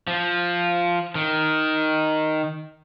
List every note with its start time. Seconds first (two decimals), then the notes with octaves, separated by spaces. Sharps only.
0.07 F3
1.15 D#3